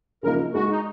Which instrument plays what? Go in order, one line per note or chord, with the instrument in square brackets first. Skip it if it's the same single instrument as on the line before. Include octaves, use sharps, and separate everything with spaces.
[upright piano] C#3 F3 A#3 D#4 [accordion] A#4
[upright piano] G#3 D#4 G#4 [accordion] F#4
[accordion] D#4